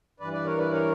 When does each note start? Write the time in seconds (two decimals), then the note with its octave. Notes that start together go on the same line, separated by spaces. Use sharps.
0.20 G2 E3 B4 D5
0.33 B4 D5
0.45 A#4 C#5
0.58 B4 D5
0.71 A#4 C#5